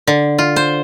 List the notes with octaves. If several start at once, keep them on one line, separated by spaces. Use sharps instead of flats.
D3
F4
C5